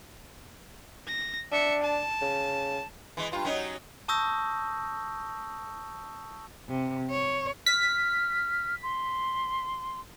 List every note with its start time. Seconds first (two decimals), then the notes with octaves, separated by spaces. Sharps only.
1.07 A#6
1.52 D4 E5 C#7
1.83 A5
2.21 C#3
3.17 E3 G#3
3.32 G2 F4
3.45 F#3 C#4 D#4
4.08 A5 C#6 D#6 E6 G6 A#6
6.69 C3
7.10 C#5
7.66 F6 B6
8.83 C6